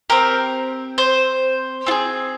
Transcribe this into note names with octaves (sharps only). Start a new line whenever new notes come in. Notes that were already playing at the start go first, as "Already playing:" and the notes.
C4 G4 A#4
C5
C4 F4 G#4